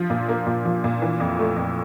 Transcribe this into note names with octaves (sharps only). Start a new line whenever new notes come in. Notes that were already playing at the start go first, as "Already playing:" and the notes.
Already playing: F3
A#2
A#3
A#2
F3
A#2
E3
F2
A3
F2